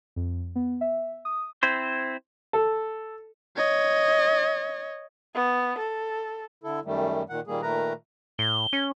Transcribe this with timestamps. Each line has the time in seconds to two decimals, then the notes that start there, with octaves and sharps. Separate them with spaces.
0.16 F2
0.55 B3
0.81 E5
1.25 D#6
1.63 C4 E4 C5
2.53 A4
3.57 C#5 D#5
5.35 B3
5.78 A4
6.64 D3 E4 A4
6.85 F#2 D#3 G3 A3
7.29 A#2 D#3 F#5
7.47 A#2 D#3 G3 A#3 G#4
7.62 A#2 D#3 A3 A#4 B4 A#5
8.39 A2 G7
8.73 C#4